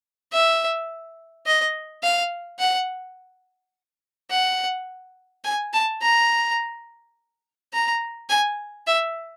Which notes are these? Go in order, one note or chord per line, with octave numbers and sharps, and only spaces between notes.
E5
D#5
F5
F#5
F#5
G#5
A5
A#5
A#5
G#5
E5